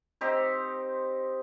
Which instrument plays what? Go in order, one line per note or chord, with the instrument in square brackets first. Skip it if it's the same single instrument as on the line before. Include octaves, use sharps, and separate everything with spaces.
[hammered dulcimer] C4 D#4 G4 C5